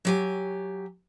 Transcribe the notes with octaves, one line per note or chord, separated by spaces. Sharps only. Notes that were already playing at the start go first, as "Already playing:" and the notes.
F#3 G4 G#5